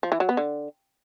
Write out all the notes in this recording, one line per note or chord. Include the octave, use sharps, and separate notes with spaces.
F3
E3
F#3
B3
D3